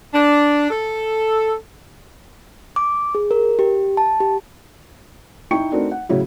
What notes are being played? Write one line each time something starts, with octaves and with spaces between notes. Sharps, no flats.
D4
A4
D6
G#4
A#4
G4
A5
G4
D#4 E4 G5 C#6 C#7
A3 C4 D4 D#4 F#4 A#4
F#5
A2 C#3 F#3 E4